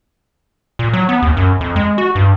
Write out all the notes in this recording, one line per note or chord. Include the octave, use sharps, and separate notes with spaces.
A#2
F#3
B3
D#2
F#2
F2
G#3
F#4
G2